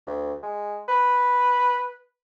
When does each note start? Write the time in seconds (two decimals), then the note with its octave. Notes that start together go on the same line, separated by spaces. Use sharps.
0.07 D2
0.43 G#3
0.88 B4